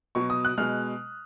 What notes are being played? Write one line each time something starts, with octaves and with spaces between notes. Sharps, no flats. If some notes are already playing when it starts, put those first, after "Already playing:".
B2 F#3 C#6
D#6
F#6
B2 G#3 F6